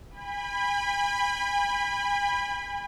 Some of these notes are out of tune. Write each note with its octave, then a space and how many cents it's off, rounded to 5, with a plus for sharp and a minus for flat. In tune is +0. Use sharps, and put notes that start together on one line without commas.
G#5 -45 B5 +0